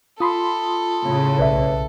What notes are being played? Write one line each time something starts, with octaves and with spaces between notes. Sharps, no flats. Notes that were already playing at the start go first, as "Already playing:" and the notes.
F4 A4 B5 C6 D#6
A2 C#3 A3
B1 B4 D5 E5